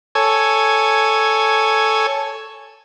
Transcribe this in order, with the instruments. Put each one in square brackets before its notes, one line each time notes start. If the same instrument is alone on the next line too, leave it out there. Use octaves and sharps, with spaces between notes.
[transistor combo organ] A4 C#5 G#5